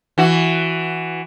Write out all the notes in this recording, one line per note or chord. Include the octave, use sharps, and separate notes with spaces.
E3 F#4